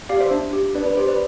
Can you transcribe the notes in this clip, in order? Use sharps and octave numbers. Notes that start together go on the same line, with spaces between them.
G4 D5 F5
C5 E5
D4
G4
D4 B4 D5
B4
G4 C5
B4 D5